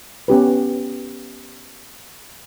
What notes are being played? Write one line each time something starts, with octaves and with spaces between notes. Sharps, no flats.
B3 C#4 G4 B4